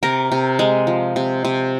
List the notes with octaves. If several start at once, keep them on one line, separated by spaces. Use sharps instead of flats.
C3 A#4
C3
G#3
F3
C3
C3